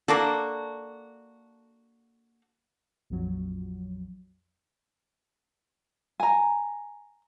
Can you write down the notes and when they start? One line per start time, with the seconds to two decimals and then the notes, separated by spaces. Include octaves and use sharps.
0.08 A#3 D4 F#4 A4
3.10 A#1 F2 F#3
6.20 G#5 A#5